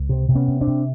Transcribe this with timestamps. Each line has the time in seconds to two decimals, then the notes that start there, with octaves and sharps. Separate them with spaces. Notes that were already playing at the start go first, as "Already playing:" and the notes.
Already playing: C#2
0.09 C3
0.29 C3
0.35 B3 C#4
0.48 C3
0.61 C4 D4
0.67 C3